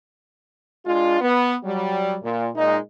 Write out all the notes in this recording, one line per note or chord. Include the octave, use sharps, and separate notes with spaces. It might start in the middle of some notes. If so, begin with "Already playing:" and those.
G#3 D4 F4
B3
F#3 G3
A#2
A#2 G#3 D#4